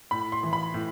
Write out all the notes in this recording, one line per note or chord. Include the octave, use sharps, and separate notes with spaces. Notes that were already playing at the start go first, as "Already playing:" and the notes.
A2 B5
C6
E3
B5
A2